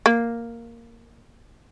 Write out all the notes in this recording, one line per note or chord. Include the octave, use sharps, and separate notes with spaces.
A#3